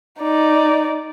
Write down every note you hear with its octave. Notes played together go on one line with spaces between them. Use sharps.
D#4 D5